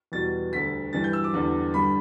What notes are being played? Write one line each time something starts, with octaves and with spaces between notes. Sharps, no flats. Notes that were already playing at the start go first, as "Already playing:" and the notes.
E2 B2 G3 A6
D2 D3 G3 B6
G2 E3 G3 A6
G6
E6
D6
E2 D3 G3
G2 D3 G3 B5